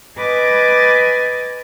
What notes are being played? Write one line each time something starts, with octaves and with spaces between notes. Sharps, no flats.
B4 D#5 G#5 D6 A6